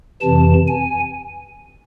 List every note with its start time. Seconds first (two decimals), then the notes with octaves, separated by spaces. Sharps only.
0.21 F2 C3 E3 A5
0.68 G#5